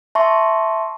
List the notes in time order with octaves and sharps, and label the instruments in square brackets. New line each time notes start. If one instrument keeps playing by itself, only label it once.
[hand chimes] E5 A5 C6 C#6